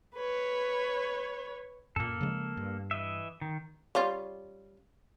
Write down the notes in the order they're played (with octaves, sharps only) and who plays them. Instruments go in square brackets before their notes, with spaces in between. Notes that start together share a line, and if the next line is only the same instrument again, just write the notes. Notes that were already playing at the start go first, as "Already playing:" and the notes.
[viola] B4 C#5
[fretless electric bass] F#2 A#2 [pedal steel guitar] A#3 A4
[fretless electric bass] C#3 F3 G#3
G2
[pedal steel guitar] E3 D#5 E5
D#3
[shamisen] G3 C#4 F4